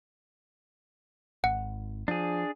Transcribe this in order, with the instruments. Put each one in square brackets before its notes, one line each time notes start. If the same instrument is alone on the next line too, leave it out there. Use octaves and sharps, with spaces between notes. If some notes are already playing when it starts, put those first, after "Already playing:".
[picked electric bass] G#1 [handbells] F#5
[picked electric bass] F3 [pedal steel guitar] D4 G#4